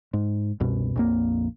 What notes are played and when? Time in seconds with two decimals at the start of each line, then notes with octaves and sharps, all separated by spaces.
0.13 G#2
0.60 C2 F#2 B2
0.96 A#1 F2 A#3